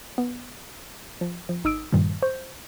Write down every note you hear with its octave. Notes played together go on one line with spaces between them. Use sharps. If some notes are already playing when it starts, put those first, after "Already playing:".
B3
F3
F3
G#1 D#4 D#6 E6 D7
G2 A#2 D#3 F3 G3
C5 C#6 G6